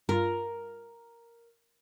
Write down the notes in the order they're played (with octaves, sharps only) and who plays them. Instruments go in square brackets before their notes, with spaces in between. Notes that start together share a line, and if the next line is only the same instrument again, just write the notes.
[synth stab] G2 F4 [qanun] A#4